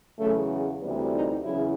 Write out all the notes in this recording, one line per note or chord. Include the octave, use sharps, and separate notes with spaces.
E2 C#3 F#3 A3
D2 C3 E3 G3 B3
D#4
E2 C#3 F#3 E4